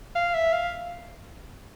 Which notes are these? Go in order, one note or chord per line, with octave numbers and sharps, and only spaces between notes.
F5
E5
F5